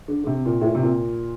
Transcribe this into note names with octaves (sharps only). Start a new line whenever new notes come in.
D3
D3
C3
A#2
A2
A#2
C3
A#2